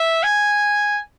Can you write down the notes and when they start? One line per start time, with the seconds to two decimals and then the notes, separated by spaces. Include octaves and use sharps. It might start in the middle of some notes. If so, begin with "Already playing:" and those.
Already playing: E5
0.23 G#5